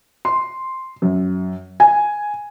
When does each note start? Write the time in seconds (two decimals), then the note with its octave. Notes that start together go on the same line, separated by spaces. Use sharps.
0.25 C6
1.02 F#2
1.80 G#5